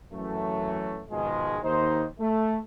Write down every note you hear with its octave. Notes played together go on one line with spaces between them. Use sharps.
F#2 E3 F#3 A3
G#2 B2 D#3 F3 G#3
D#2 D#4 C5
A3